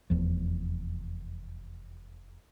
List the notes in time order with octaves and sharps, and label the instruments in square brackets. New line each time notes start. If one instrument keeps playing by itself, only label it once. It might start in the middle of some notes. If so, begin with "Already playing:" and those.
[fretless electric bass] F1 E2 F3